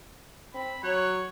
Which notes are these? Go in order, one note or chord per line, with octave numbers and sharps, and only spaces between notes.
C4 B5
F#3 C#5 F#6